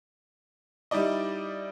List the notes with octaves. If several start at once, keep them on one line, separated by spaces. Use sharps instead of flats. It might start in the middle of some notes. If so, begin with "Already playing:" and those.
G3 D#4 E4 D5 D#5